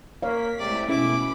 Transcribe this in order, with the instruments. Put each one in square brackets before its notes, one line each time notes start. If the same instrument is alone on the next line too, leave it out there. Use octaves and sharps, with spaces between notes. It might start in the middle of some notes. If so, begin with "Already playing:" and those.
[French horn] A#3 [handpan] C#5 F5 [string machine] B6
[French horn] C3 [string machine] G#3 A3 E4 [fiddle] D5
[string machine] B2 B5 [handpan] C#4 [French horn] E4 [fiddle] D6